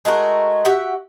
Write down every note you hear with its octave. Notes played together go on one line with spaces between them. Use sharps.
G#3 A3 F#4 A#4
F#4 G4 E5 F#5